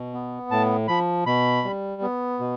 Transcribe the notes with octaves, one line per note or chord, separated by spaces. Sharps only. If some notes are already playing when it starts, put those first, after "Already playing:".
Already playing: B2
B3
A2 A5
F3 B5
B2 B5
G3
B3
B2